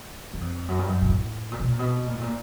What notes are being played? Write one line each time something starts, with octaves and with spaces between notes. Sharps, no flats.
F#2
F2
F#2
G2
F#2
A#2
A2
A#2
B2
A#2
B2
A#2
A2
A#2